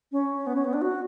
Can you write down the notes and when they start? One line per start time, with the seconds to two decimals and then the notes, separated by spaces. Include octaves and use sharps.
0.12 C#4
0.47 B3
0.55 C#4
0.65 B3
0.73 D4
0.82 F#4